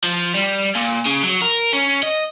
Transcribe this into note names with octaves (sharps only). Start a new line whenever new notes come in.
F3
G3
A#2
C#3
F#3
A#4
C#4
D#5